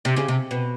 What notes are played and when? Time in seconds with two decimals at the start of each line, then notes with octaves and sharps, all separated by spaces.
0.05 C3
0.16 C#3
0.28 C3
0.51 B2